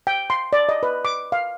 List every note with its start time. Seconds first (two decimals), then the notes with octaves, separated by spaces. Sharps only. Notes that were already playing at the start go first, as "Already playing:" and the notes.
0.07 G5
0.30 C6
0.53 D5
0.69 D#5
0.83 B4
1.05 D6
1.32 F5